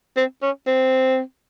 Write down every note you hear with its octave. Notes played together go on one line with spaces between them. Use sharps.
C4
C#4
C4